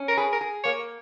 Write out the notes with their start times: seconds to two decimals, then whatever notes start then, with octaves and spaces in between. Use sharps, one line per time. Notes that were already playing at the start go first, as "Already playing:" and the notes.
Already playing: C#4
0.08 A#4
0.17 G#4 B4
0.33 A#4
0.41 G#4
0.64 A#3 C#5